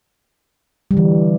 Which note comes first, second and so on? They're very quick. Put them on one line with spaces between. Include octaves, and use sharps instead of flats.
G3 D3 E3